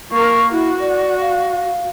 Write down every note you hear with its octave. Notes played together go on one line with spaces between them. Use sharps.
A#3 A#4 C#6
E4 F#4
D5
F5